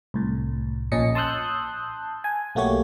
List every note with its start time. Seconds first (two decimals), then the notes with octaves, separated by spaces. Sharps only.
0.14 C2 A2
0.92 A#1 A#2 C#4 D#5 C#7
1.15 A5 C6 D#6 E6 F#6 G6
2.24 G#5
2.55 B1 A3 A#3 F#4 G4 C#5